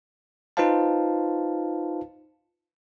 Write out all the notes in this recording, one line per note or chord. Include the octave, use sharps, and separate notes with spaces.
D#4 F4 B4 C5 F5 A5